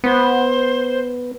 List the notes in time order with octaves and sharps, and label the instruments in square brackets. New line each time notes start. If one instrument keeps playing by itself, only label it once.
[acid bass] B3 [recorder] C5